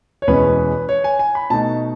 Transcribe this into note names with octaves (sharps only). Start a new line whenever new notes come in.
C#5
E2 B2 G#3 C#4 B4
C#5
G#5
G#5
B5
B2 A3 D#4 A5